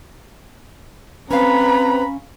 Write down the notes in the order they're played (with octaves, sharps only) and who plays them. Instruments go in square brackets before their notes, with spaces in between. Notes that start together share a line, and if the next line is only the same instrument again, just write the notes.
[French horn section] C4 [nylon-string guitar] C#4 F5 [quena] B4 [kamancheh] A#5 B5